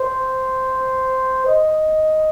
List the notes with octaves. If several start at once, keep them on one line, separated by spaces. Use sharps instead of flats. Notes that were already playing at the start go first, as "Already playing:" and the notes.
Already playing: C5
D#5